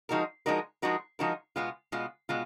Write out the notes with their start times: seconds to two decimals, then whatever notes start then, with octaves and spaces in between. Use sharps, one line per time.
0.09 F3 G#3 D#4 F#4 A#4
0.46 F3 G#3 D#4 F#4 A#4
0.82 F3 G#3 D#4 F#4 A#4
1.19 F3 G#3 D#4 F#4 A#4
1.56 B2 G#3 B3 F4
1.92 B2 G#3 B3 F4
2.29 B2 G#3 B3 F4